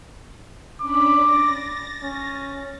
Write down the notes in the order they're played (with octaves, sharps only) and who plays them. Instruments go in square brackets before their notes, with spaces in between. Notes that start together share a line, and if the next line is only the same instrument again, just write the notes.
[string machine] C#4 D4 B5 [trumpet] D6
[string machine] A6 A#6
[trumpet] C#4